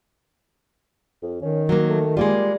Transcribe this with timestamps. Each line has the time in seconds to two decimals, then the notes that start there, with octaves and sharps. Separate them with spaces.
1.22 F2
1.42 D#3 C#4
1.69 F#3 A#3 A#4
1.89 A3
2.17 G3 G#3 A#3 F4